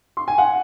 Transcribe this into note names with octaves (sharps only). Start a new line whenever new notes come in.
C6
G#5
F#5